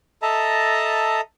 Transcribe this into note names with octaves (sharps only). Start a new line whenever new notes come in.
A4 D#5 E5 A5 A#5